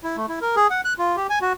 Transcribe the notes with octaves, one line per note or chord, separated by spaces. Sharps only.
E4
A3
E4
A#4
G#4
F#5
F#6
F4
G4
G#5
F#4